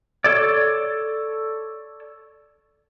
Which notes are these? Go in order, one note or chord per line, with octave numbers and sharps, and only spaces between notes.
A4 C#5 D5